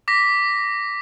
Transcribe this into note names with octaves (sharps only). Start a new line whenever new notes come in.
D6 A#6 B6